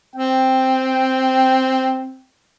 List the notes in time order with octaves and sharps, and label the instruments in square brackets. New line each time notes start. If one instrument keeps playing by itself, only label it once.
[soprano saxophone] C4 [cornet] G5